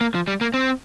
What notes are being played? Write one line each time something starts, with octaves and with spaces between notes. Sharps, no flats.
A#3
F3
G3
A#3
C4